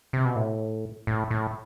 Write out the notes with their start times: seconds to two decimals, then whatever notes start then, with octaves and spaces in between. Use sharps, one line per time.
0.13 C3
0.25 B2
0.36 A2
1.07 A2
1.31 A2